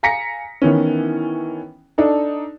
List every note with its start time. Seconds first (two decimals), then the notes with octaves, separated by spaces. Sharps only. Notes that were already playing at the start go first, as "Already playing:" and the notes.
0.03 F5 G#5 A#5 A#6 B6 C#7
0.62 D#3 E3 B3 C#4
1.98 D4 D#4 A4